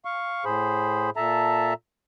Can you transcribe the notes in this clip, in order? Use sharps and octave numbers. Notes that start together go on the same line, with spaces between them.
F5 C#6
A2 G#4 C5 B5
A#2 A4 E5 A5 A#5